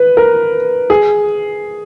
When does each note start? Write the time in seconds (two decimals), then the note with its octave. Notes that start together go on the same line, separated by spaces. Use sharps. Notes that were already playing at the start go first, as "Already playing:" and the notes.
Already playing: B4
0.17 A#4
0.90 G#4